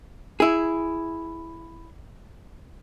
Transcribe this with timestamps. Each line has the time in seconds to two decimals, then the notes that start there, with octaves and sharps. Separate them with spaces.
0.40 E4 G#4